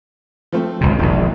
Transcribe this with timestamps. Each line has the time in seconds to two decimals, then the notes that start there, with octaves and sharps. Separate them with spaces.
0.52 F3 A3 C4
0.81 G#1 C#2 C3
0.98 E1 A#1 A#2 D#3